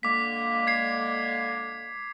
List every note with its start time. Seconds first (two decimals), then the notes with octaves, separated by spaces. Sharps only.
0.03 D3 G#3 A#3 D6 B6
0.67 G#6 C7